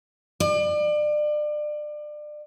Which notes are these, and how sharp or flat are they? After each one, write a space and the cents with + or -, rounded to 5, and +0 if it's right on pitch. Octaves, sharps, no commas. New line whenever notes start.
D5 +30